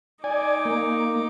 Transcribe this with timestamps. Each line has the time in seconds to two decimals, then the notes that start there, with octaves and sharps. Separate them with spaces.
0.24 D#4 D5 G#5 D6
0.65 A#3